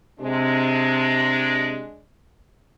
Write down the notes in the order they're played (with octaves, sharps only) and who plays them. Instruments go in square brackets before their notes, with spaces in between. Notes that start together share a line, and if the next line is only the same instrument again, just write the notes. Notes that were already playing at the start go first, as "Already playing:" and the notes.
[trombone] C3 [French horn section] G#3 D4